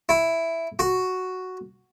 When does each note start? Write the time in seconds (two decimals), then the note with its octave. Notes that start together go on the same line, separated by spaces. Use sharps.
0.09 E4
0.79 F#4